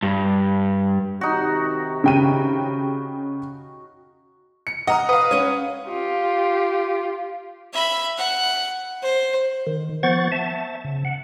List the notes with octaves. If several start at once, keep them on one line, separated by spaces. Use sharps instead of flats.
G2
C3 D#3 D#4 F#4 G4
C#3 G5 D#7
C#7
D#5 F#5 A#5 D#6
B4 F5 D#6
C#4 C#5
F4 G4
E5 B5
F#5
C5
D#3
F3 B3 C5 F#5 C#6 A6
E5 A5
C#3
F#5